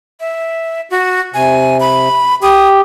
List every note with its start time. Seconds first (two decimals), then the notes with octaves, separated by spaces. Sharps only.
0.20 E5
0.90 F#4
1.34 C3 G#5
1.80 B5
2.42 G4 D#6